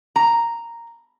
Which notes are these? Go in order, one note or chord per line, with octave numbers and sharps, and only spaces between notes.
A#5